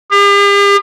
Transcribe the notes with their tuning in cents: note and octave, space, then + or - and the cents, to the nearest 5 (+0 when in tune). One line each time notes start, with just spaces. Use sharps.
G4 +45